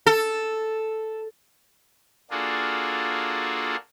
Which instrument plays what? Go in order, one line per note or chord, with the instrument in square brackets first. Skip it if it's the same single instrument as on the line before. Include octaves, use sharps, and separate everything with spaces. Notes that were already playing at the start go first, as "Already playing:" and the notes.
[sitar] A4
[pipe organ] A#3 D4 F4 F#4 G#4 A4